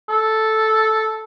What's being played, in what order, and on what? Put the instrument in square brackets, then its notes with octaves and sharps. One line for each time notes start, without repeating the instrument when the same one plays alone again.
[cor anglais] A4